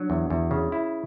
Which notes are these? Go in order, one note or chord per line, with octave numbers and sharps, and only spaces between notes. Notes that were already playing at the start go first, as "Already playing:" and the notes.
Already playing: F#3 D4 F#4
E2
E2
C#3
E4